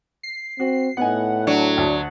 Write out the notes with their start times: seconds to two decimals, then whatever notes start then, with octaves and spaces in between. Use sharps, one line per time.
0.23 C7
0.60 C4 F#4
0.97 A2 B3 D#4 F#5 G#5
1.47 F#3 D4
1.77 D2